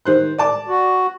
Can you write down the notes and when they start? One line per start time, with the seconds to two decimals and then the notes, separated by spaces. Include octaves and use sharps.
0.06 D#3 C5 F#6
0.38 D5 A5 D6
0.68 F#4